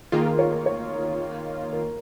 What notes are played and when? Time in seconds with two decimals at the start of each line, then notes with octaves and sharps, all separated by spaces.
0.12 D#3 A#3 F4 G#4
0.27 A#4
0.39 C#5
0.52 A#4
0.66 C#5
1.72 A#4